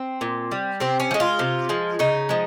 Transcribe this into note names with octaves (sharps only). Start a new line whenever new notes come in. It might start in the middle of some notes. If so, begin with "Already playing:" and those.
Already playing: C4
A#2
G3
C3 C4
C#4
F3
G#3
F4
C3
F3 G#3
C#3 D#4
F3 G#3